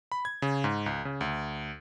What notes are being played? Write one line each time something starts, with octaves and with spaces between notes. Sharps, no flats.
B5
G#6
C#3
G#2
C#2
C#3
D2